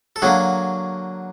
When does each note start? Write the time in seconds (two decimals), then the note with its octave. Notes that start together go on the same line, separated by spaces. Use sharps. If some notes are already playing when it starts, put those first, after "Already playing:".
0.16 A4
0.22 D3 F#3 A#3 F#4 G#4